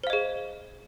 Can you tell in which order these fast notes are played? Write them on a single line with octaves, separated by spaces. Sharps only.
C5 F5 D#5 G#4